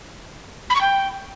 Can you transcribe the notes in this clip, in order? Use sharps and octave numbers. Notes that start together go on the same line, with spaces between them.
B5
C#6
G5